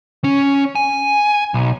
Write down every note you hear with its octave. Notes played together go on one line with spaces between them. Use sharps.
C#4
G#5
B1